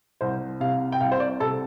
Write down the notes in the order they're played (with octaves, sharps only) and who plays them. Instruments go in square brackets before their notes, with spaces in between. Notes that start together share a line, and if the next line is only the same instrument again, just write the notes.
[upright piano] C2 C5
C3 F5
G5
C2 F5
C5
D5
C3 A4